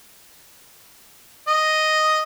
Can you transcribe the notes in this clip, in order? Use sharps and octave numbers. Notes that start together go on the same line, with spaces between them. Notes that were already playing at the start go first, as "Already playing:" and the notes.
D#5